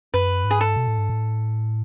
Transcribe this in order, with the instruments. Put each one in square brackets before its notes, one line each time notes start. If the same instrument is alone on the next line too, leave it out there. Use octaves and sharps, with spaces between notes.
[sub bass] F#2 [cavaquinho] B4
[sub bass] G#2
[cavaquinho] G#4
A4
[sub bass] B2
A2
G#2
A2